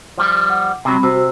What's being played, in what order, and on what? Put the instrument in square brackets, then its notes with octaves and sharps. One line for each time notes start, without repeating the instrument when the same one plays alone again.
[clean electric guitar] F3 G3
[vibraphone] F#5
[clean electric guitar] C3 F#3 [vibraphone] G3 C4 B5
[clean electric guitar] C3 [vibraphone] F#4 C5 E6